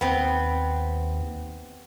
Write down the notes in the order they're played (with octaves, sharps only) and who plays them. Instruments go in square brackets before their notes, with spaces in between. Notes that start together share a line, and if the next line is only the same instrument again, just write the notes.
[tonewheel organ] D#2 [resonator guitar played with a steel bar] B3 C4